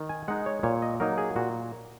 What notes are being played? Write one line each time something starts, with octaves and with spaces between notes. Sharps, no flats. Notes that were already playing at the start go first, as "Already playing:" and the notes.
Already playing: D#3
G#5
G#3 D#4 F#5
C#5
A#2 C#5
D#5
F#3 A#3 D#4 A#4
G#4
A#2 F#4